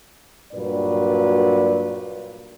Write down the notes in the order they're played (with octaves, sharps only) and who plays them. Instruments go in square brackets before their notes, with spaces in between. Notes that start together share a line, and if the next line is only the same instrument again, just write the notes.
[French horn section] G2 A#2 F#3 B4 D5